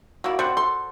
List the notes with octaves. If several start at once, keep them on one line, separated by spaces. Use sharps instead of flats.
A#3 E4 F#4 D5
G3 C4 C5 F#5
A4 C6